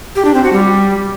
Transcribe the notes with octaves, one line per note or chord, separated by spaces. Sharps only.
G4
D4
C4
F#4
G3